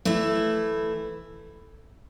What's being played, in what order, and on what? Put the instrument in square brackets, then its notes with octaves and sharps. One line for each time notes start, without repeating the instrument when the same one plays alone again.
[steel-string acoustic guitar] E3 A3 E4